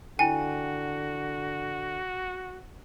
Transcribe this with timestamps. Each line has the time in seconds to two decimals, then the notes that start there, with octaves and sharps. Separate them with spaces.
0.19 D3 E4 F#4 G5 G#5